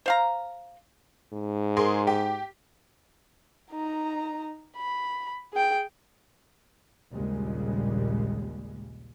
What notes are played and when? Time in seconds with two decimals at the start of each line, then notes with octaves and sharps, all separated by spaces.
0.06 C5 F5 A#5
1.33 G#2
1.77 G#4 A#4 C6
2.07 G4
3.72 D#4 A#5
4.77 B5
5.53 G#4 G5
7.13 A#1 D#2 A#2 C#3 G3 G#3